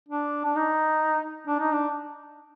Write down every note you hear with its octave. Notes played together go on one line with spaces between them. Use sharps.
D4
D4
D#4
D4
D#4
D4